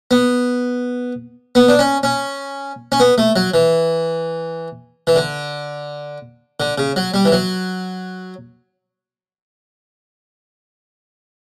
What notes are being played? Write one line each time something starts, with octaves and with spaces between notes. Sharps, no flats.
B3
B3
D4
C#4
C#4
C#4
B3
A3
F#3
E3
E3
D3
D3
C#3
F#3
G3
E3
F#3